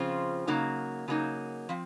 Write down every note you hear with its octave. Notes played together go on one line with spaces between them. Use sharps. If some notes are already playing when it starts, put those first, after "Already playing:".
Already playing: C#3 F3 C4 F4
C#3 F#3 A#3 D#4
C#3 F#3 A#3 D#4
F3 C4